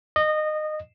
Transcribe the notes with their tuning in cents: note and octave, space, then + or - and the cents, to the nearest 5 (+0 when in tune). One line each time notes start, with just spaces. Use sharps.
D#5 -20